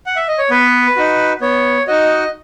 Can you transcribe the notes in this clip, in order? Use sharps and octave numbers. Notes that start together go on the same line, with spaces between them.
F#5
E5
D#5
C#5
B3 B4
D#4 F#4
B3 C#5
D#4 F#4 D#5